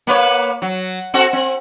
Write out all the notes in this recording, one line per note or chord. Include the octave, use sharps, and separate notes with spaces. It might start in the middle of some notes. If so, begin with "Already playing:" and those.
A#3 B4 C#5
F#3
C4 F#4 A4
C4